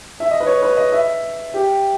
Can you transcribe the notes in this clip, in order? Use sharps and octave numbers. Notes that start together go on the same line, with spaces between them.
E5
D#5
B4
C#5
B4
D#5
E5
G4